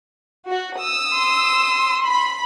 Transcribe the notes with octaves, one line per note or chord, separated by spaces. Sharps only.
F#4
D#6 E6
C6
B5